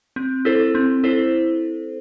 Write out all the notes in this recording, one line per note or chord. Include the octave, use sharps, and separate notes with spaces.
C4
E4 A4 C5
C4
E4 A4 C5